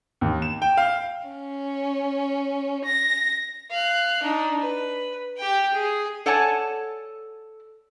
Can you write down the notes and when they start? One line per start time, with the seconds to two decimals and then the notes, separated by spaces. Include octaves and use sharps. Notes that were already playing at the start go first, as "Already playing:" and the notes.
0.21 D#2
0.42 E7
0.62 G5
0.77 F5
1.28 C#4
2.85 A#6
3.71 F5 F#6
4.22 D4 D#4
4.60 B4
5.37 G4 G5
5.73 G#4
6.26 A4 C#5 D5 F#5 G#5 A5